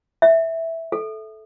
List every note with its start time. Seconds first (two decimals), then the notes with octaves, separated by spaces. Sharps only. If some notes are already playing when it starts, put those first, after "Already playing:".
0.22 E5
0.92 A4